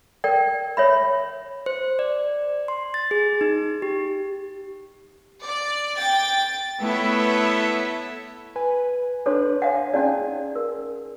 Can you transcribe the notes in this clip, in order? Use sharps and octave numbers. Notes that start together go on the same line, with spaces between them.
A#4 D5 G5
C#5 E5 B5
C5
D5
C6
A6
G#4
D#4
G4
D5
G5 A6
A3 B3 E4 A4 C#5 E5
B4 G#5
D4 A4 B4 C#5
C#5 F5 F#5 G#5
C#4 D#4 G#4 D5 G#5
A#4